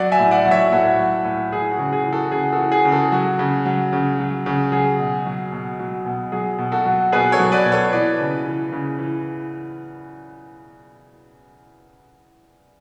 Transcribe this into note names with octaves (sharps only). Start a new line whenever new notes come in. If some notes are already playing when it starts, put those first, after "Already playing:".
Already playing: F#3 D5 F#5
E5 G#5
A2
D5 F#5
F#3
C#5 E5
A2 F#4 A4
F#3
A2
E3 G#4
F#4
C#3
G#4
E3
F#4 A4
C#3 G#4
F#4 A4
E3
G#4
C#3
F#4 A4
F#3 F#4
C#3
F#3
C#3
F#3
C#3
F#3 G#4
B2
F#3
B2
F#3
B2
F#3 G#4
B2
F#4 A4
F#3
B2 G#4 B4
A4 C#5
F#3
B4 D5
B2
A4 C#5
E3 B4 D5
C#3
E3
C#3
E3